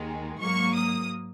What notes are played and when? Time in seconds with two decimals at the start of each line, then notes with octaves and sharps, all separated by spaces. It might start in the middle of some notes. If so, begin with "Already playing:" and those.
Already playing: D#2 D#3 G#3
0.38 G#2 F#3 A#3 C#6
0.74 D#6